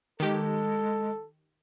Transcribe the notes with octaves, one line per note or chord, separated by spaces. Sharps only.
D#3 G#3 G4 A4